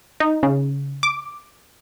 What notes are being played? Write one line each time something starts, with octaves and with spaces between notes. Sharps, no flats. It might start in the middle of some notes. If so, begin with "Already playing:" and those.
D#4
C#3
D6